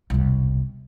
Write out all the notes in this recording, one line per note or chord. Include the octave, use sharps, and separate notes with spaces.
E1 C2